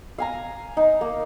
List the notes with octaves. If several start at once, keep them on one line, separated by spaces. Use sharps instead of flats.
F5 G#5 A#5
D#4
A#3